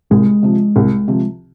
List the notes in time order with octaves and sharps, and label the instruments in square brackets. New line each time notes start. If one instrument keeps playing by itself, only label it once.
[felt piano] C2 [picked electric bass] G#3
[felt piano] C3 F3
C2
C3 F3